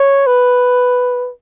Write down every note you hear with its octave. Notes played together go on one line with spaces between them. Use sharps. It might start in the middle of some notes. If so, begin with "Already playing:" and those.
Already playing: C#5
B4